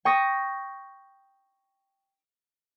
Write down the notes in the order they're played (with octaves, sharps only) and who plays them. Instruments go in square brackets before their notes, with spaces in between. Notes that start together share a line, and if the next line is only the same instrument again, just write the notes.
[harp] G5 C#6 D#6 A#6